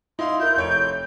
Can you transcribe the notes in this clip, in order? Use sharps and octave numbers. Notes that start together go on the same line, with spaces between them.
D#4 E4 F5 C6
E4 A#4 G6
F1 C#5 D7